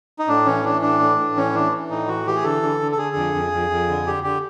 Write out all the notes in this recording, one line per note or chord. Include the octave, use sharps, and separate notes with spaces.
D#4
A2 D4
E3 C#4
E3 D4
A2 D4
A2
A2
E3 C#4
E3 D4
E3
A2 D#4
E3 F#4
E3 G4
G#4
D3 A4
D3
D3
A4
D3 G#4
F2
F2
F2
F2
D3
D3 G4
D3 G4